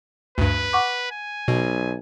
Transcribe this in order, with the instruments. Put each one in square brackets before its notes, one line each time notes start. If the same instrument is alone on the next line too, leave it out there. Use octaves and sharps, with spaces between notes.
[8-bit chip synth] D2 G2 [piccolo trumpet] B4
[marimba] F#5 C#6 D6
[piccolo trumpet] G#5
[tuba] B1 [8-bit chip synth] B2